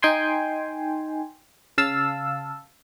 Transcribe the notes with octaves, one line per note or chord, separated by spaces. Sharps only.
D#4 G5 G#5 C6
C#3 F5 A5 E6